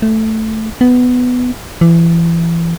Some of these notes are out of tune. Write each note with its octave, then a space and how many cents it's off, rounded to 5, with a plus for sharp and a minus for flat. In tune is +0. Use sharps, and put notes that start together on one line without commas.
A3 +0
B3 +10
E3 +30